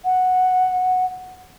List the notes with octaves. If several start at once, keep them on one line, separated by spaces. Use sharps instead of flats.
F#5